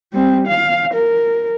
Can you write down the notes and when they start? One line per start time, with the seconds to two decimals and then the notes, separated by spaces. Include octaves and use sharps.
0.13 G3 C4
0.47 F5
0.94 A#4